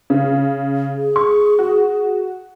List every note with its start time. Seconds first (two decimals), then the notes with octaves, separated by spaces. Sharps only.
0.10 C#3
0.96 G#4
1.16 C#6
1.59 F#4